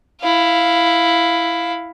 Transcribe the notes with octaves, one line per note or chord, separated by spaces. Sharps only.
E4 F5